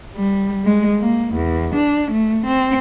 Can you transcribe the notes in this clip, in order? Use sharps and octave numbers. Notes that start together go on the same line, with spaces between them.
G3
G#3
A#3
E2
D4
A3
C4